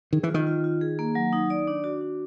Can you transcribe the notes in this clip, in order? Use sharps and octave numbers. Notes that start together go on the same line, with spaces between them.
D#3 G#4
E3
D#3 F4
F4
F4
G#4
A#3
F#3
D#4
D5
D4
F#4
D4